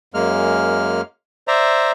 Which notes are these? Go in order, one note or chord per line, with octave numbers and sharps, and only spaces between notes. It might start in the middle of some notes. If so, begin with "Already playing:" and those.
F#2 G#3 A#3 F6
C5 D5 E5 A#5